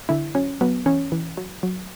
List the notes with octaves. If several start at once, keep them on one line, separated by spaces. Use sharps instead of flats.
D3 E4
F#3 C#4
F#3 B3
E3 C#4
E3
F#3
F#3